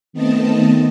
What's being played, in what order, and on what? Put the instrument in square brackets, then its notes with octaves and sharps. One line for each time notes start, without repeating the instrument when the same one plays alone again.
[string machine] D#3 A3 B3 C4 D#5 A5